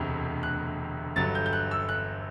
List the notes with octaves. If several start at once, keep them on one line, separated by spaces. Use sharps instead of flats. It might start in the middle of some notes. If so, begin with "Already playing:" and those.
Already playing: E1 D2 C3
F#6
G1 G2 D3 F#3 A6
G6
G6
F#6
E6
F#6